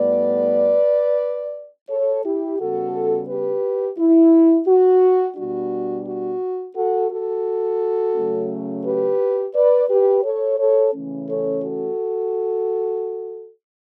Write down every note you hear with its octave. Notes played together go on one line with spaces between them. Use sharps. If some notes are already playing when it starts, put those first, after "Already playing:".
Already playing: A2 G3 B3 B4 D5
A4 C#5
E4 G4
C#3 G3 B3 F#4 A4
G4 B4
E4
F#4
B2 G3 D4 F#4
F#4
F#4 A4
F#4 A4
C#3 F#3 A3 C#4
G4 B4
B4 D5
G4 B4
A4 C#5
A4 C#5
C#3 E3 A3 C#4
A4 C#5
F#4 A4